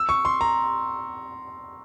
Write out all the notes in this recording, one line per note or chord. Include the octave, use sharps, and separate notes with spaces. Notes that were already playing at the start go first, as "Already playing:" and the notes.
Already playing: E6
C#6
C6
A#5